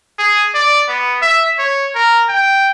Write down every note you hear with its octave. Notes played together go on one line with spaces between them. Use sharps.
G#4
D5
B3
E5
C#5
A#4
G5